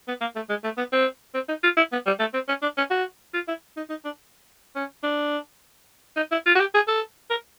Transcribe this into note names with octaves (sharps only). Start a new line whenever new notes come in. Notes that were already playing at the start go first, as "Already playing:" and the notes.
B3
A#3
A3
G#3
A3
B3
C4
C4
D#4
F4
E4
B3
G3
A3
C4
C#4
D4
C#4
F#4
F4
E4
D#4
D#4
D4
C#4
D4
D#4
E4
F4
F#4
G4
G#4
A4
A#4